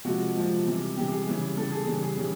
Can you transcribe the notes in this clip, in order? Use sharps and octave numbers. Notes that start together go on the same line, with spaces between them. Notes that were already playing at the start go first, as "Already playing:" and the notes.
C3 F3 G#3 F#4
C3 F3 G#3
C3 E3 G3
C3 E3 G3 G4
G#4
C#3 E3 G3
C#3 E3 G3 A4
G#4
C#3 E3 G3
G#4
C#3 E3 G3